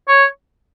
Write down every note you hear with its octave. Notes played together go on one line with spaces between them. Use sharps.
C#5